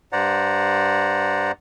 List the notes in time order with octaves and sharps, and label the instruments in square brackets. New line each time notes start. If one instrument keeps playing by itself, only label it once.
[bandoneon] G2 C5 D5 F#5 A#5